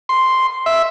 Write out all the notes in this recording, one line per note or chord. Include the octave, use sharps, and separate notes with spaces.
C6
E5